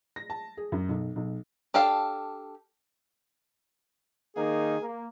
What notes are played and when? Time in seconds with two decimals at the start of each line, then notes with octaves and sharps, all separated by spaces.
0.16 A#6
0.30 A5
0.57 G#4
0.72 F#2
0.89 B1
1.16 B1
1.74 D4 G4 A4 F5
4.36 D#3 A#3 D#4 G#4
4.81 A#3